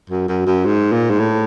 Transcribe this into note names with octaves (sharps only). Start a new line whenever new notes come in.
F#2
F#2
F#2
G#2
A#2
G#2
A2